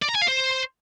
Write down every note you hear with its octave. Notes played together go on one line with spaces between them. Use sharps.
D5
A#5
G#5
F5
C5